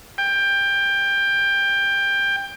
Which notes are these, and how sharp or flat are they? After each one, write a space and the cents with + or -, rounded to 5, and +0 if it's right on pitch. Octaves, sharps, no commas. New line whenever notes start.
G5 +20